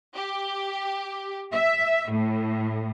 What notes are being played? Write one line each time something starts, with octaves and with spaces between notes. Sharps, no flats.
G4
E5
A2